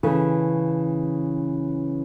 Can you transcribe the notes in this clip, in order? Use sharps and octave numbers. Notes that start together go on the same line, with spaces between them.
C#3 E3 A4